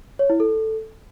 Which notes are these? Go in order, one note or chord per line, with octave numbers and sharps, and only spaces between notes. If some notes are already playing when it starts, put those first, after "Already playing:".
C#5
E4
A4